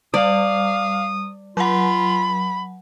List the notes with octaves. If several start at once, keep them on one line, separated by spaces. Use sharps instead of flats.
G3 D5 F5 D#6
F#3 F4 F#5 B5